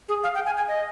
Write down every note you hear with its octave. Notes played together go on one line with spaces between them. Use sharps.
G#4
F5
G5
G#5
G#5
D#5